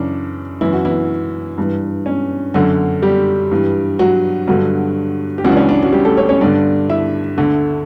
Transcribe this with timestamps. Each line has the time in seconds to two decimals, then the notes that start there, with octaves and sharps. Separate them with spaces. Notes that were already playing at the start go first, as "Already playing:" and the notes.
Already playing: F#2 C#3 E3 D4
0.61 F#2 E3 E4
0.73 F#4
0.85 E3 E4
1.58 G2 E3
2.06 C#4
2.54 F#2 D3 F#3 F#4
3.02 G3 G4
3.51 G2 E3
3.99 F#3 F#4
4.48 G2 D3 F#3 F#4
5.38 G4
5.44 C#2 C#3 E3 F#3 F#4
5.52 D4
5.57 C#4
5.69 D4
5.83 F#4
5.93 G3 G4
6.05 A3 A4
6.17 C#4 C#5
6.29 C#4 C#5
6.41 G2 D3 D4 D5
6.89 E4 E5
7.38 D2 D3